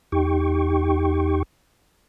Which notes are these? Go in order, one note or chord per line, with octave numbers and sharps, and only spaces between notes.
E2 D#4 G4 G5 C#6